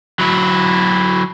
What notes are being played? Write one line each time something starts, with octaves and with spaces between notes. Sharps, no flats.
F#3 E4